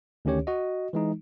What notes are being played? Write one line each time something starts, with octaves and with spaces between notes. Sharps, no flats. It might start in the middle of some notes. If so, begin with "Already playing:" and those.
D2 D#3 C#4 G4 C#5
F#4 D#5
E3 G#3 D#4